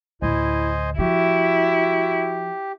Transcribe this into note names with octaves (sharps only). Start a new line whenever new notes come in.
D2 A2 E4 C5 D#5 G#5
F3 E4 F#4 G4